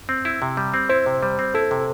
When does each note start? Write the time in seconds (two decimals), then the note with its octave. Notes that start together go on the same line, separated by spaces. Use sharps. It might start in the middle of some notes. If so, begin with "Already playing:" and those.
0.09 C4
0.25 E4
0.42 C3
0.57 G3
0.74 C4
0.89 E4 C5
1.06 C3
1.23 G3
1.39 C4
1.55 E4 A4
1.71 C3